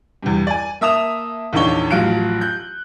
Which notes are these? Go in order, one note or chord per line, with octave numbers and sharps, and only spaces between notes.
E2 G2
D5 G#5
A#3 E5 A5 D#6 E7 F7
A#1 E2 D#3 D4 C#5 G7
A1 F3 F#3 F5 F#6 D7
F#6 G6